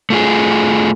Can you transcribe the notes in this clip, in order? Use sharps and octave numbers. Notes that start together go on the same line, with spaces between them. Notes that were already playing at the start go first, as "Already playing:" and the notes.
A3 F4 G#4